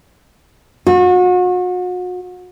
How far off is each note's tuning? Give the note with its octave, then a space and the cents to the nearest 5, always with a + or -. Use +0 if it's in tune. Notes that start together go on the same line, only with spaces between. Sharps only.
F#4 -35